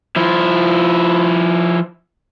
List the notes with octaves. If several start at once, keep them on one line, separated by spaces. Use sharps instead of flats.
F3 E4